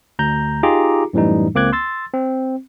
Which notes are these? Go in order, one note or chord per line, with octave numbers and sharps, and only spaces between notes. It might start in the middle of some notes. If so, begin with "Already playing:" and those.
D2 A#5 G6
D#4 F4 G4 G#4 A#5 D6
F#2 A2 E3 G3 D#4
C#2 A#3 C4 D6 F#6 G#6
C6 E6 A6
C4